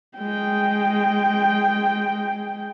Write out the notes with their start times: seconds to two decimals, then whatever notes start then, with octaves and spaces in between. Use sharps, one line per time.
0.18 G#3 G5